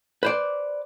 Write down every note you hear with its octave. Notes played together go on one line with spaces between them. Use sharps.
B4 C5 D5